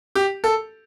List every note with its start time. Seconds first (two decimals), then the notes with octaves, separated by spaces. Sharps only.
0.15 G4
0.44 A4